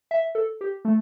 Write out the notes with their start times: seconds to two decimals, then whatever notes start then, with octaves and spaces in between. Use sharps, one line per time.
0.11 E5
0.35 A4
0.61 G4
0.85 A3